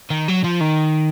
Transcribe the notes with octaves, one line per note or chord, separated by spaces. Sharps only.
D#3
F#3
F3
D#3